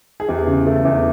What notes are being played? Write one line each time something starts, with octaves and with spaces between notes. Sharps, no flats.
G#4
E2 G4
C#3
A3
E2